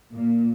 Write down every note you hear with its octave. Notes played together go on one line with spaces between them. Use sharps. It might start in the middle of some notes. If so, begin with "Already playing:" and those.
A#2